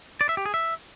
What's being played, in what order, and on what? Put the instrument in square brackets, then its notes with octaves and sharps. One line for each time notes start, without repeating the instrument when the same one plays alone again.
[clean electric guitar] D5
E5
G4
G#4
E5